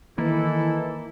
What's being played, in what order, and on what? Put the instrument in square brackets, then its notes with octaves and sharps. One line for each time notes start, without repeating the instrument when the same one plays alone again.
[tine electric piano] D#3 [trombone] E3 [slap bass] A#3 [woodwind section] D#4 E4 A4